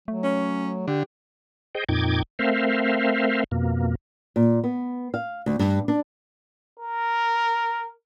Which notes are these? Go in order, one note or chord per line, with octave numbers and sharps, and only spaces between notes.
F#3 A3
C#4
D3 G4
G#4 C5 D#5 G5
F2 A#2 D#4 G5 D6 G#6
A3 C4 A#4 C5 E5 F5
F2 B2 A#3
A#2
B3
F5
D2
G2
D4
A#4